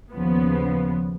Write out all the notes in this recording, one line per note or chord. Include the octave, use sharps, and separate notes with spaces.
D#2 C#3 F3 B3